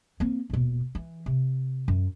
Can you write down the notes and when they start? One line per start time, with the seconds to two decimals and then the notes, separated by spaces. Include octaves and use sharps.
0.20 A#3 C4
0.50 D#1 B2
0.95 E3
1.26 C3
1.88 F#2